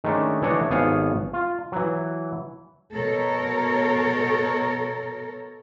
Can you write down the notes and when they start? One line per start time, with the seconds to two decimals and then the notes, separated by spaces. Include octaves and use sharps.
0.04 D#3 G#3 A3 C#4 D4
0.42 E3 A3 D4 C#5 D#5 A5
0.70 G#1 B3 G#4 A4 C#5 F5
1.33 F4
1.72 E3 F#3
2.93 B2 A4 A#4 C#5